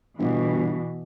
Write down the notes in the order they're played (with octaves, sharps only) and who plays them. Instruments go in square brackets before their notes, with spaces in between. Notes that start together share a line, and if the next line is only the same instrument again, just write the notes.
[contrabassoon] G1 [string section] B2 E3